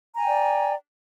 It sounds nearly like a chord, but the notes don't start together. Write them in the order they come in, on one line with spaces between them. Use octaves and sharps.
A#5 G#5 G5 D5